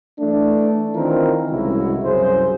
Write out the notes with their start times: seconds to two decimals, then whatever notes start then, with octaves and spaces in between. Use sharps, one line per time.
0.19 E3 A3 D4
0.94 D#3 E3 C4 F4 A#4
1.50 C2 C#3 G#3 E4 F#4
2.04 C2 F#2 C#3 G#4 C5